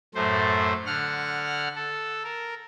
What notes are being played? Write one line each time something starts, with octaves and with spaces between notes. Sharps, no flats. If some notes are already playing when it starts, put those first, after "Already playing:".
F#2 A2 A3 C5
D3 F#5 F6
A4
A#4